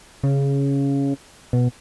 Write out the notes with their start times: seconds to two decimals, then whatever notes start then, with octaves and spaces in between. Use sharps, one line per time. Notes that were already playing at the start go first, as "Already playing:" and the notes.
0.23 C#3
1.53 B2